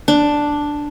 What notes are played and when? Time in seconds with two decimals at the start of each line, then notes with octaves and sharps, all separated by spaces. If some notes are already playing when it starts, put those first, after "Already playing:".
0.08 D4